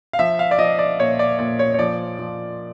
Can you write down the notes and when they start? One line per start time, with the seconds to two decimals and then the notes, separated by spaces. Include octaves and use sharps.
0.13 F5
0.19 F3 E5
0.39 F5
0.51 D5
0.58 F3 D#5
0.79 D5
0.99 A#2 C#5
1.19 D5
1.39 A#2 D5
1.59 C#5
1.74 C#5
1.79 F3 D5
2.19 F3